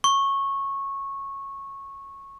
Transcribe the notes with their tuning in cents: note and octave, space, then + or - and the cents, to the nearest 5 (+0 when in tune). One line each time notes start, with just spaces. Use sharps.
C#6 -15